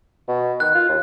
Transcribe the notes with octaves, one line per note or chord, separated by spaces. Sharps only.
B2
D#3 F#6
F4
D#2